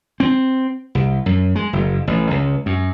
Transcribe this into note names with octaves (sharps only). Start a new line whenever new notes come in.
C4
C2
F#2
G#3
F#1
A1
C#2
F#2